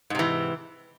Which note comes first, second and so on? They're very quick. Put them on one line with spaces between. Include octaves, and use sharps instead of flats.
G#2 C3 E3